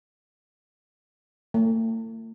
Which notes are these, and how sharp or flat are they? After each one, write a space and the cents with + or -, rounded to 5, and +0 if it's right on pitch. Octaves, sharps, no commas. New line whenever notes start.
A3 +40